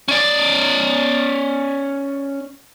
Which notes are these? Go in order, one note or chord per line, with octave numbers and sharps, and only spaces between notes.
C#4 D5